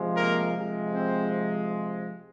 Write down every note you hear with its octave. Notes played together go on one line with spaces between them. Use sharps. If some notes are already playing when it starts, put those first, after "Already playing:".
Already playing: C3 F3 G#3
A#3 A#4
C3 F3 G#3
C4 C5